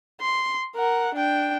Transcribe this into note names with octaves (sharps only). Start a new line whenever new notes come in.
C6
A#4 F#5
D4 G5